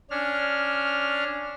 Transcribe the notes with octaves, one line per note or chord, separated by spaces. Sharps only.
C#4 D4 F6